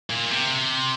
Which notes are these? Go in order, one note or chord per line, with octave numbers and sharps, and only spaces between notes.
A#2
C3